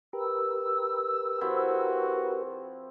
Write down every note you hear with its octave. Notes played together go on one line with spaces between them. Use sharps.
G4 A#4 B4 E6
F3 C4 E4 F#4